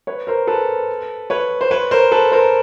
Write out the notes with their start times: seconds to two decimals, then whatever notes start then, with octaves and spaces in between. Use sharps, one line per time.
0.07 B4 C#5
0.27 A#4 C5
0.47 A4 B4
1.30 B4 C#5
1.61 C5
1.71 B4 C#5
1.91 A#4 C5
2.12 A4 B4
2.32 A#4 C5